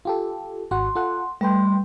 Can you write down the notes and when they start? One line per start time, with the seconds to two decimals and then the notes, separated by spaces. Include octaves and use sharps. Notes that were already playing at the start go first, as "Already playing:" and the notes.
0.05 F4 G4 A4
0.71 G#1 F#4 F#5 C6
0.95 F4 A4 F#5
1.41 G3 A3 B4 G5 C6